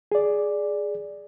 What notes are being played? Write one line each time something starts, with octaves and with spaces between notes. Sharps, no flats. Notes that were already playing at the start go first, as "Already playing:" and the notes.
G#4 D5